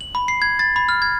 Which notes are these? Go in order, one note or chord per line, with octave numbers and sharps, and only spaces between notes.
F#7
B5
C7
G#6
A6
B5
F6
G#6